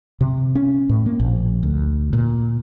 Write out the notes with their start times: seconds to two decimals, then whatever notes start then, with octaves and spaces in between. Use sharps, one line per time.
0.21 C3
0.55 C#4
0.89 A2
1.06 A#3
1.20 A#1
1.63 D2
2.13 A#2